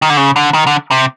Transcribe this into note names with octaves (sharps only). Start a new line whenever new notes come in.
D#3
D3
C#3
D3
D#3
D3
C3